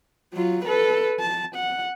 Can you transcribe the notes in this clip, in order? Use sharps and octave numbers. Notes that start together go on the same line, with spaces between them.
F#3 F4
A4 B4
A5
F#5